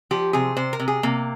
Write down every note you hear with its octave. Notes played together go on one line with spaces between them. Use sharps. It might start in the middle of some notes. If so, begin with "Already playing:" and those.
F3 G4
C3 G#4
C3 C5
A#4
C3
G#4
C3 A#3